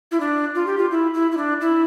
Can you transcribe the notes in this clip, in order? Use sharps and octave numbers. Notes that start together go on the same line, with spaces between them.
E4
D4
F4
G4
F4
E4
E4
E4
D4
E4